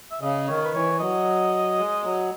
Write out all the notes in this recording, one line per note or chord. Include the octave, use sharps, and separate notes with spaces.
E5
C#3 D#5
D#3 C#5
B4
E3 C#5
F#3 D#5
G#3
F#3